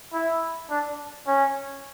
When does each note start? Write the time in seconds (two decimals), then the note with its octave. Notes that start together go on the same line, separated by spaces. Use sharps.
0.13 E4
0.70 D4
1.27 C#4